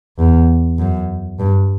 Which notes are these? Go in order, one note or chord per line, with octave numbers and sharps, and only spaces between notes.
E2
F#2
G2